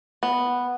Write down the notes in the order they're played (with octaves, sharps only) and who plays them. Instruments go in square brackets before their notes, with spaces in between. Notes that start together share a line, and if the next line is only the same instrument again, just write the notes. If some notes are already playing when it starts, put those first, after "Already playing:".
[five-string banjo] B3